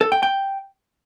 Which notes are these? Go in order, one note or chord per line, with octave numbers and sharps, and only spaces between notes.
A4
G5
G5